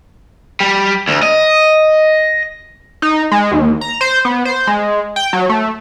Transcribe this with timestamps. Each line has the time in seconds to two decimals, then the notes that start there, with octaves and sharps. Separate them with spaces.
0.60 G3
1.08 D2
1.23 D#5
3.02 D#4
3.32 G#3
3.51 D#2
3.81 A#5
4.01 C5
4.25 B3
4.45 C5
4.67 G#3
5.16 G5
5.33 F#3
5.49 A3